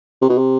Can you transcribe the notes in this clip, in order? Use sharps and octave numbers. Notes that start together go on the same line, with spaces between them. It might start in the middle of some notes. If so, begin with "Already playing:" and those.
C3
B2
C3